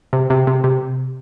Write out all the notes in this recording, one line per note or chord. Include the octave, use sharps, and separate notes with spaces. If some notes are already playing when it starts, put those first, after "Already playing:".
C3
C3
C3
C3